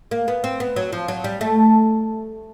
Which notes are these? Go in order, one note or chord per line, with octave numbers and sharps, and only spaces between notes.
A#3
B3
C4
B3
F#3
F3
F#3
G3
A3